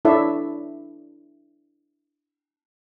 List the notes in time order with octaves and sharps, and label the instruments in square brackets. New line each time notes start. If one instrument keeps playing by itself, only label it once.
[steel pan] D4 E4 A4 C#5 D5 E5